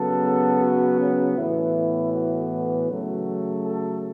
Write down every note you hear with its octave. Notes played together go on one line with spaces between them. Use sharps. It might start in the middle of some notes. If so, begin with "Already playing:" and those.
Already playing: C#3 F#3 B3 A4
F#4
C#4
A2 E3 B3 E4
F#4
C#3 F#3 A3
A4